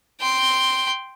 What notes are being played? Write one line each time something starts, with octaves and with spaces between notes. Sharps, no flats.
G5 C6